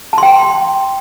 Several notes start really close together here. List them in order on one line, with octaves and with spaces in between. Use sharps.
A5 C6 G5